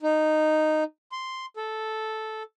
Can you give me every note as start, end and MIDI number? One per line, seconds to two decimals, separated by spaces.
0.03 0.84 63
1.12 1.46 84
1.57 2.43 69